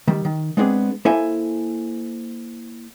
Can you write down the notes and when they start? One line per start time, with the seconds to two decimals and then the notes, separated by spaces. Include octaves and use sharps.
0.08 D#3 G3
0.25 D#3
0.57 G#3 B3 C4 D4 F#4 G#4
1.05 A#3 E4 A4 C5 E5 G#5